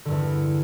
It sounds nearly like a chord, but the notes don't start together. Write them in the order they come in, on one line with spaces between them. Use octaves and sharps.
D3 G2 E2